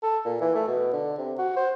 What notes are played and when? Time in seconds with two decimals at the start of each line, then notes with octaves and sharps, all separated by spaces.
0.03 A4
0.25 A#2
0.41 E3
0.55 A3
0.68 B2
0.93 D3
1.18 C3
1.38 F#4
1.57 C5